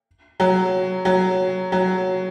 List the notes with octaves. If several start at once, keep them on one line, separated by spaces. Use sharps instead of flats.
F#3
F#3
F#3